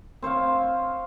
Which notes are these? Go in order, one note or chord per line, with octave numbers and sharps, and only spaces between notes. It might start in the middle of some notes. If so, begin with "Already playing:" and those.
C4 C5 C#5 F5